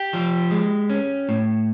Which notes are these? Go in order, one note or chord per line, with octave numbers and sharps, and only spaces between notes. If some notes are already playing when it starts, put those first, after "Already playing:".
Already playing: G4
F3
G#3
C#4
A2